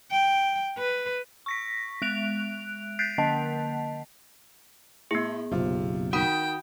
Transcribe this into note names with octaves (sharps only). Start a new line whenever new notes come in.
G5
B4
C#6 A#6 B6
G#3 F#6 D7 F7
F#6 G6 A6 B6 C7 D7
D3 A#3 D#5 A5
A2 B3 G#4
F#1 B1 C3 F4
D#3 F#4 F#5 G5 B5 D#6